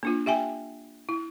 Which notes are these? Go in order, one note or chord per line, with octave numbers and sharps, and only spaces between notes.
A#3 D4 F4
G4 E5 G5 G#5
E4